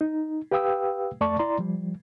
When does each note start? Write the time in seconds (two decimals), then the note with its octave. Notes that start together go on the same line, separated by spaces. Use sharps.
0.01 D#4
0.51 G4 B4 F5 G5 D#6 E6
1.21 F2 A3 D5 A5 C#6
1.39 E4 D5 A#5 C6
1.58 F3 G3